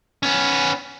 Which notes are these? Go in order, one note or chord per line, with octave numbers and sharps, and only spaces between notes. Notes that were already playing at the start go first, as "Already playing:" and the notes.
B3 C#4